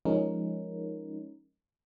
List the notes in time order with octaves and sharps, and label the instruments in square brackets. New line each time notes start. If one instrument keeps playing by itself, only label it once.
[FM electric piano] F3 G#3 C#4 D#4 A#4